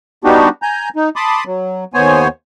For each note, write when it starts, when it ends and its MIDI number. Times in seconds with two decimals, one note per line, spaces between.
0.24 0.49 55
0.24 0.49 59
0.24 0.49 62
0.24 0.49 63
0.24 0.49 66
0.24 0.49 67
0.62 0.89 80
0.62 0.89 82
0.62 0.89 91
0.96 1.09 63
1.16 1.44 81
1.16 1.44 83
1.16 1.44 84
1.16 1.44 86
1.16 1.44 87
1.47 1.84 54
1.94 2.28 39
1.94 2.28 59
1.94 2.28 72
1.94 2.28 73
1.94 2.28 80